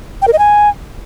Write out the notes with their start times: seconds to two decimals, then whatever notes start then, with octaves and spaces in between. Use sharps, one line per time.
0.22 G5
0.27 A#4
0.33 D#5
0.39 G#5